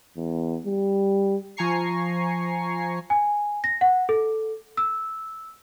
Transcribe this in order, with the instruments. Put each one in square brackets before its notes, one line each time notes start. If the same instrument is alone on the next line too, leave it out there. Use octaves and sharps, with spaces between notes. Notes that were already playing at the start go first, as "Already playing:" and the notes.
[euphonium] E2
G3
[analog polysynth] F3 G#5 A#5 C#6 C7
[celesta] G#5
A#6
F#5
A4
E6